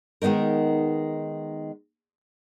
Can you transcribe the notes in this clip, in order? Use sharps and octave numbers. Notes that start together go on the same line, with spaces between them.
D#3 G#3 B3 D#4 A#4